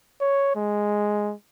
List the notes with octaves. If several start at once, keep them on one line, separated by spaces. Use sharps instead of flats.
C#5
G#3